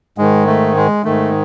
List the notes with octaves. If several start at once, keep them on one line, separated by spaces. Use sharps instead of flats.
G#2 D#3 G#3
A3
G#3
G#2 D#3 A3